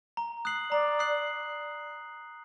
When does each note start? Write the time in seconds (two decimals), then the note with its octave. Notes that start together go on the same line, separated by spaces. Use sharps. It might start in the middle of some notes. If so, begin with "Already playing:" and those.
0.17 A#5
0.45 D#6 F#6 C7 F#7
0.72 D5 A#5
0.99 D#6 F#6 C7 F#7